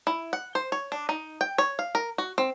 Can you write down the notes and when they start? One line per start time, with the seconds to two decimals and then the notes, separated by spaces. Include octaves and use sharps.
0.07 E4
0.33 F#5
0.55 C5
0.72 C#5
0.92 D4
1.09 D#4
1.41 G5
1.58 C#5
1.79 F5
1.95 A#4
2.18 F#4
2.38 C4